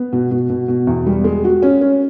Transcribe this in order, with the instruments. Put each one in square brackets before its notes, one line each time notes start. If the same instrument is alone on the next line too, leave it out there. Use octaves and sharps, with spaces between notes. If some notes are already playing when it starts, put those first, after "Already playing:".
Already playing: [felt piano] B3
B2
B2
B2
B2
E2
G3
G#3
F#4
C#4
C#4